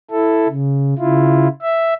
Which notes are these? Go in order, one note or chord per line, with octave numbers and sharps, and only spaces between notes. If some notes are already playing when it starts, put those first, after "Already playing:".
E4 A4
C#3
C#3 E4 F4
E5